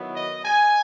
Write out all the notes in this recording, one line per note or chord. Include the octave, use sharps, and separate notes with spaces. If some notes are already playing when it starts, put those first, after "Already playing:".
Already playing: D#3 F#3 B3 E4
D#5
G#5